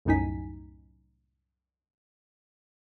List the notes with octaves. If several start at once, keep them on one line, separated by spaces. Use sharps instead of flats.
C2 F#2 A2 D#4 G#5 B6